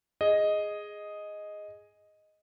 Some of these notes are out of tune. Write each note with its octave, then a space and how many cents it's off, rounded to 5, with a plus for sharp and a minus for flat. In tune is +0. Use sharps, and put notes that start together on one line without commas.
G#4 +0 D#5 +0